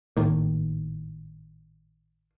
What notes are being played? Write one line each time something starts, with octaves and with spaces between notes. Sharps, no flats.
G#1 A2 D#3 A#3